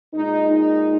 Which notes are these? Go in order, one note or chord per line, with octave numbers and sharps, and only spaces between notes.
A#2 G#3 D#4
D#4